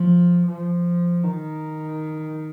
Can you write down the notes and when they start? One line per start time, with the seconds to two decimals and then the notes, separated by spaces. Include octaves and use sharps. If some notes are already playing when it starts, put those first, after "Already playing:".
Already playing: F3
0.48 F3
1.23 D#3